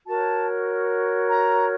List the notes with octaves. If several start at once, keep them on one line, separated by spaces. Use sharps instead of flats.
F#4 A#4 C#5 A5
A#5